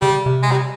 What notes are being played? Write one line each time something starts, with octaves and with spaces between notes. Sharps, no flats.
C#3 G3
C3
G#3
G3